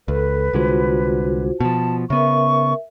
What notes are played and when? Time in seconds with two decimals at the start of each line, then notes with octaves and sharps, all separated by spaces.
0.08 C#2 A4 B4
0.53 C2 D3 G#3 F4 F#4 C5
1.60 B2 F3 A5
2.10 C#3 B3 A#4 E5 C#6